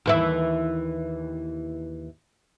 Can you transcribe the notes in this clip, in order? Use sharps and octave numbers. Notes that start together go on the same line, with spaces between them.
D#2 E3 E4